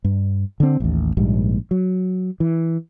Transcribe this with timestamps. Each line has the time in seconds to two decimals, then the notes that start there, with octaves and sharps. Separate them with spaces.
0.04 G2
0.60 D3 C4
0.80 A1 D#2
1.17 A#1 G#2 G3
1.71 F#3
2.40 E3